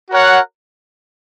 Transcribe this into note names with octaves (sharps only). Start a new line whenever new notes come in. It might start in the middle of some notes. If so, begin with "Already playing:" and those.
F#4 A#4 C#5 F#5